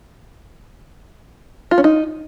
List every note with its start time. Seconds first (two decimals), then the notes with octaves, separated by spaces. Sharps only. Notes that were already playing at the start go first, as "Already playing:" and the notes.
1.71 F4
1.78 C#4
1.84 D#4